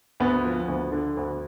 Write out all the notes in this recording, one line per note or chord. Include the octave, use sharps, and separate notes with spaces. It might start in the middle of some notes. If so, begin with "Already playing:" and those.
D2 B3
F3
D2
D3
D2